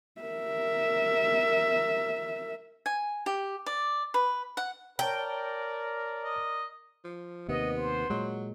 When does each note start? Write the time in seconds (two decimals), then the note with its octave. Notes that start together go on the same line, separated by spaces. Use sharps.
0.21 A#4 E5
2.86 G#5
3.26 G4
3.66 D5
4.14 B4
4.57 F#5
4.99 A#4 C#5 D5 G5 A5 A#5
6.24 D#5
7.04 F3
7.48 D#2 C3 B3 D#5
7.77 C5
8.10 A#2 F#3 G#3